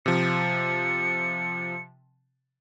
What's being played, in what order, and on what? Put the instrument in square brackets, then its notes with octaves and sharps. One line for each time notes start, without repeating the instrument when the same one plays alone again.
[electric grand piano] C3 F3 [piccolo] C#7